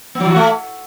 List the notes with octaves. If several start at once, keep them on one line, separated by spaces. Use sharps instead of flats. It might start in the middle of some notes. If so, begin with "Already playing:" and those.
B3
F#3
E3
F#4
A3